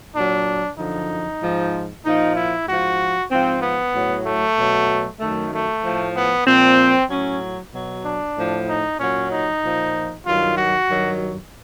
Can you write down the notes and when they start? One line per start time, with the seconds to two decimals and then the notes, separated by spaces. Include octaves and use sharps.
0.15 A#2 F#3 D4
0.78 F#2 D3 F3 D#4
1.42 G#2 F3
2.05 A#2 F3 D#4
2.36 E4
2.67 G#2 F3 F#4
3.31 G#2 F3 C4
3.62 B3
3.94 A2 F#3
4.25 A3
4.58 B2 F#3
5.20 F#2 D#3 F#3 A3
5.53 A3
5.84 A2 F3
6.16 B3
6.47 A#2 F3 C4
7.10 A2 F#3 C#4
7.74 B2 F#3
8.05 D4
8.37 A2 F3
8.69 D#4
8.99 A#2 F#3 C#4
9.31 D#4
9.63 A#2 F3
10.26 G2 D#3 F#3 F4
10.57 F#4
10.89 G2 D#3 F#3